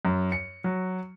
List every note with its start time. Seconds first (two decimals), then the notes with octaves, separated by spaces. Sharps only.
0.05 F#2
0.32 C#7
0.64 F#3